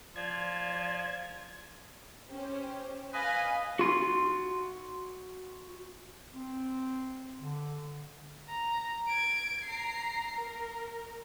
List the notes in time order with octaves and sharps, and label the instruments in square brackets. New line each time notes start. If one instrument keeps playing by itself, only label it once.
[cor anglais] F3 [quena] D5 [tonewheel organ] G#6
[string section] C#4 G4 C5
[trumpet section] B4 D#5 [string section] F5 G#5
[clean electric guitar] F#4 C6
[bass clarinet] C4
D3
[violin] A#5
G#6 D7
A#5 C7
A#4